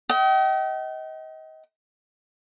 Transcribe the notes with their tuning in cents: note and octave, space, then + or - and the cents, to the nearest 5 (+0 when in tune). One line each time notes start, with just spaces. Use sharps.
D#5 +30 G5 -40